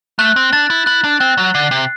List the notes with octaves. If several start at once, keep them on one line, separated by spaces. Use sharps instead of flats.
A3 F#6
C4
D4 A6
E4
E4 F#6
D4
C4 F#6
F#3
D3 C7
C3